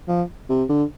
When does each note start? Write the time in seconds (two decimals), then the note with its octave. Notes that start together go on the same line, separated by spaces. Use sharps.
0.08 F3
0.49 C3
0.69 D3